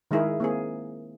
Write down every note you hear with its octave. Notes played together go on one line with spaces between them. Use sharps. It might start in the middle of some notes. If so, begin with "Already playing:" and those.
D#3 G#3 D#4 E4 G#4 A#4
A#3 C4 G#4